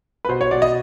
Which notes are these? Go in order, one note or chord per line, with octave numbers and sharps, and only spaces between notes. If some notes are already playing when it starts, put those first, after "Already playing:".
B4
B2 C5
C#5
B2 D5
D#5